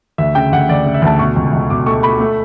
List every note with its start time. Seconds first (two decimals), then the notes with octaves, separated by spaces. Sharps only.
0.18 D2 E5
0.35 C#3 G5
0.52 D2 F#5
0.69 D2 D5
0.86 C#3
0.94 E5
1.02 D2 A5
1.19 B2 C#6
1.36 C#2
1.53 C#2
1.70 B2 D6
1.86 A3 C#6
2.03 A3 B5
2.20 A3